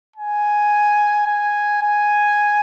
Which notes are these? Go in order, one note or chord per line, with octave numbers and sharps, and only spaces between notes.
G#5
G#5
G#5